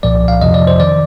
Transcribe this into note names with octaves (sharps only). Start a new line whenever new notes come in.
C2 A#2 F3 D5
F5
F2 C3 F3 D#5
D5
C5
D#3 D5